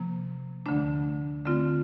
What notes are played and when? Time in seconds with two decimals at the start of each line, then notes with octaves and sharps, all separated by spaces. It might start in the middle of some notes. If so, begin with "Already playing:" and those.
Already playing: C3 F3 A#3
0.66 D2 D3 A3 D4
1.45 D3 A3 C4 F4